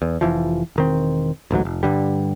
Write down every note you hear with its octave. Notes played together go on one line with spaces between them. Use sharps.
E2
F1 E3 F3
E1 D#3 C4
A1 D2 G#2 F#3
F1
G2 D3 G3